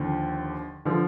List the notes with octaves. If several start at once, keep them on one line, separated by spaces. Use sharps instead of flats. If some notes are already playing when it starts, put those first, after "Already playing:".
Already playing: D#2 D3 F3
D3 F3